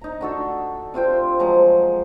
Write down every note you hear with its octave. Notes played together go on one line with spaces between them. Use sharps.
D#4 A#5
D3 F#4 A4
C3 F4 C5 G5
F3 F#3 G#3 A#5